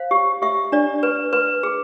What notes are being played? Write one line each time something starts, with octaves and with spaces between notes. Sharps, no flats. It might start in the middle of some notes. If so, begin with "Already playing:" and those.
Already playing: C5 F5
G4
G4 E5
D4 D5
B4
B4
G#4